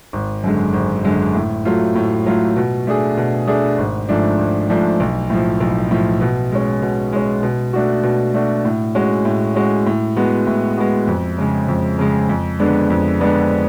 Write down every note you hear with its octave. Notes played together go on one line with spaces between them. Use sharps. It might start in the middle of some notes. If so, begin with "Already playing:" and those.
G#1
F#2 D3 G#3
G#1
F#2 D3 G#3
A2
F#3 A3 F4
A2
F#3 A3 F4
B2
A3 D4 G#4
B2
A3 D4 G#4
G#1
G#2 F3 A3 D4
G#1
G#2 F3 A3 D4
B1
A2 F3
B1
A2 F3
B2
G#3 C#4
B2
G#3 C#4
B2
A3 D4 F#4
B2
A3 D4 F#4
A2
G#3 C#4 F#4
A2
G#3 C#4 F#4
A2
G#3 B3 F#4
A2
G#3 B3 F#4
F2
C#3 G#3
F2
C#3 G#3
F2
D3 G#3 B3 D4
F2
D3 G#3 B3 D4